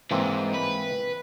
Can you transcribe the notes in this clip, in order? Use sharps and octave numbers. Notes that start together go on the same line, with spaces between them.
G#2 E3 A#3 C4
B4